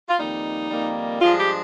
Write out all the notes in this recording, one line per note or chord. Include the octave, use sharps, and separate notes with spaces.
F4
F2 D#3 G3 A#3 D#4
F2 D#3 G3 A#3
G2 F3 G#3 D4 F4
G4